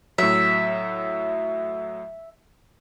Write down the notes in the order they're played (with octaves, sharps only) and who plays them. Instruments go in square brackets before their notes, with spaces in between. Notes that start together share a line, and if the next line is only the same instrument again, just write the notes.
[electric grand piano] A2 F#3 [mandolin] E5